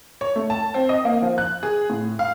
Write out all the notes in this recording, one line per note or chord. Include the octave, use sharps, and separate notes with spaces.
C#5
A3
A5
C4
D#5
A#3
F3
F#6
G#4
A2
F5